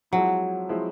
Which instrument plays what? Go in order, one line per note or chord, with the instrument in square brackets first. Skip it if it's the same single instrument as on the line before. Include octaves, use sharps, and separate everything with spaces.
[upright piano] F3 G#3 C4 E4 [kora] F#3
[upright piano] F3 G#3 C4 E4